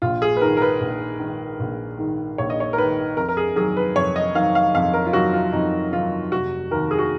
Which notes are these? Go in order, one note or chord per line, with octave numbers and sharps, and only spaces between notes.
A#1 F4
G#4
B4
G#2 D#3 A#4
A#4
B4
A#1
G#2 D#3
A#1
G#2 D#3
A#1 C#5
D#5
C#5
A#4
G#2 D#3 B4
F2 A#4
A#4
G#4
D#3 F#3 G#4
B4
F2 C#5
D#5
D#3 F#3 F5
F5
F2 F5
A#4
F4
D#3 F#3 F#4
F4
F2 D#4
D#3 F#3 F4
F1 F#4
D#2 D#3 A#4
G#4
F#4